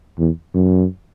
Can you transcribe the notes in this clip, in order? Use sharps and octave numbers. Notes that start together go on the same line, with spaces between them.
E2
F#2